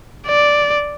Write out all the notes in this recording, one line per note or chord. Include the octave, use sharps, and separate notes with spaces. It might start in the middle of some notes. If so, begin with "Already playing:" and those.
D5